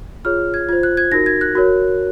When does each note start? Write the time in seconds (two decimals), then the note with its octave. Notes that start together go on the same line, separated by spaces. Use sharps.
0.25 F4 G#4 C#5 F6
0.54 G#6
0.69 F4 C5 G#6
0.83 F#6
0.97 G#6
1.12 D#4 F#4 A#4 A#6
1.26 G#6
1.41 F#6
1.55 F#4 A#4 C#5